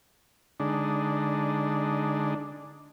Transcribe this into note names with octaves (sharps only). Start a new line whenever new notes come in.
D3 G#3 D4 D#4